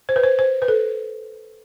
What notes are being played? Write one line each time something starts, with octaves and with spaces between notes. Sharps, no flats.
C5
B4
C5
C5
B4
A4